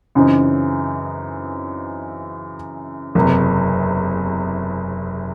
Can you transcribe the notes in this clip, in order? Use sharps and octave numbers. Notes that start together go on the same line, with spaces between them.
F#2 C#3 E3 C4 D#4
F#1 E2 C3